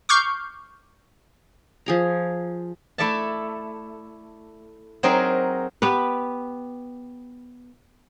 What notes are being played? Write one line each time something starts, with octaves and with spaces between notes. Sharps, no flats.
C#6 D6 F6 G6 C7
F3 G#4 A#5
A3 E4 A4 D5 E5 A5
F#3 C4 D#4 G#4 A#4
B3 G4 B4